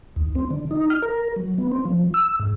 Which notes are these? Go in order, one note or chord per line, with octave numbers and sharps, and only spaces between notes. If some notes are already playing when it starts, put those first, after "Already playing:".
D#2
C4
D3
D#4
F6
A#4
F#3
B3
C4
F3
E6
G#2